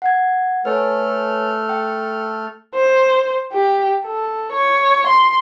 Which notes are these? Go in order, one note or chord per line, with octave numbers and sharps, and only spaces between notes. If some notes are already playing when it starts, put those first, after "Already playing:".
F#5 G#6
A3 A4 B4 C#5 G#5 F6
G5
C5
G4
A4
C#5
C6